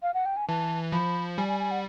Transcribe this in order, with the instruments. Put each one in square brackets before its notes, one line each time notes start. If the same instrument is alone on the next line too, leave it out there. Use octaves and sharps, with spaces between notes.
[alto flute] F5
F#5
G5
G#5
[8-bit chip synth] E3 [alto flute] A5
[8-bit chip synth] F3 [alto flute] B5
[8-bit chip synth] G3 [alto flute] G#5
[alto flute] G#5
G#5
F#5